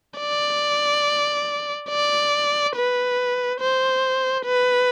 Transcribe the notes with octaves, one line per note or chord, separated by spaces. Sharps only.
D5
D5
B4
C5
B4